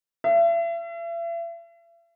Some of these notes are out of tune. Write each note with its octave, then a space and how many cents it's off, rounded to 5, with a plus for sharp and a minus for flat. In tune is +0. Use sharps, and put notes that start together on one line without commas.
E5 +40